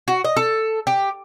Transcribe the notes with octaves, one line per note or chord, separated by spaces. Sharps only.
F#4
D#5
A4
G4